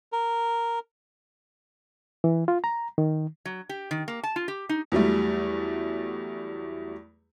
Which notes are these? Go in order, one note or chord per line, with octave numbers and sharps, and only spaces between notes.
A#4
E3
F4
A#5
D#3
F#3
G4
D#3
A#3
A5
F4
G4
D#4
E2 F#3 G3 A3